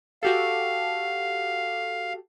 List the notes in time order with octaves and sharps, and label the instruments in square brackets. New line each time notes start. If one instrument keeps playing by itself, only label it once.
[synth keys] F#4 G4 A4 [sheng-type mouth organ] F5